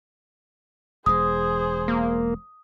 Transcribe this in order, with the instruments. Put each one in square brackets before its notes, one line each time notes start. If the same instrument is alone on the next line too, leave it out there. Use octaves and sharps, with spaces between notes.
[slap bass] E1 G#3 [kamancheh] G#4 C5 [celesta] D#6
[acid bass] A#3